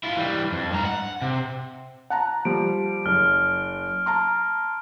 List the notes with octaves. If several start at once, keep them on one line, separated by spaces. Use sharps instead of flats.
E4 F4
E3 G3
F2
G2 A#5
F#5
C3
F#5 A5 A#5
F3 G3 D7
F#1 F6
A5 A#5 C6